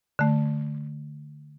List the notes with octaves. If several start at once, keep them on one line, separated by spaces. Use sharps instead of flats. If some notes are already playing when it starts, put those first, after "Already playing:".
D3 A3